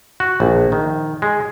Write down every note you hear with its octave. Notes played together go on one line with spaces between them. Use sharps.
F#4
A#1
D#3
G#3